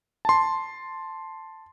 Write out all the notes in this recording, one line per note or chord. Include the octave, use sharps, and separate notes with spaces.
A5 C6